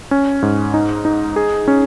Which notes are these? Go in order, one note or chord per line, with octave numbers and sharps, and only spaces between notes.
C#4
G#2
D#4
D#4
G#4
C#4